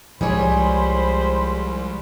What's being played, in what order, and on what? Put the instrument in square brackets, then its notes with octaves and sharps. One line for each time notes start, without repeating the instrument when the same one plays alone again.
[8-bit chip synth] C2 [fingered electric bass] F3 G#3 [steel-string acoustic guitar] G3 G#4 C#5 [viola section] C5 B5